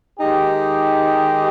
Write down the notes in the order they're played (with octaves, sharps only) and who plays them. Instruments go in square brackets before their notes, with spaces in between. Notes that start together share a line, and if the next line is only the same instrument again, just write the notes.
[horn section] D#3 G#3 D#4 G4